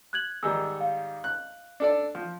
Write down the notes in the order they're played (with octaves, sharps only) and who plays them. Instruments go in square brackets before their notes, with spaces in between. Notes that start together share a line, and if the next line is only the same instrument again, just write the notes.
[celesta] F#6 G#6 F#7
[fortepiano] G#2 D#3 G3 [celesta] E6
[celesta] F5
[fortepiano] F#6
D4 A4 D5
F3